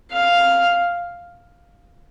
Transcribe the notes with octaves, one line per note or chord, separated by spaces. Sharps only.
F5